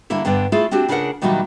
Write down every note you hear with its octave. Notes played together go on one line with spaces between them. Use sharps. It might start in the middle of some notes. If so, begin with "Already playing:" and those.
D3 G3 A#3 E4 A4
G2 D3 B3 D5 G5
A3 E4 F4 G#4
C4 D4 F#4 G4
C#3 D4 F4 G#4 A#4 F#5
A#2 D#3 E3 F#3 G3 A#3